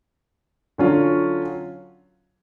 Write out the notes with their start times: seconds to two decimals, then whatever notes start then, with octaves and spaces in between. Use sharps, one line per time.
0.78 D3 F#3 C#4 F4